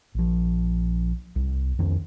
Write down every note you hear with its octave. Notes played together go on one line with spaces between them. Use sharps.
A#1 F3
C2
F2 D#3 C#4